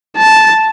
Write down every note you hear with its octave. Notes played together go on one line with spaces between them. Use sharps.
A5